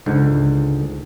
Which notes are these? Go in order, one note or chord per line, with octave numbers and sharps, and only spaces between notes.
C#2 G#2 D3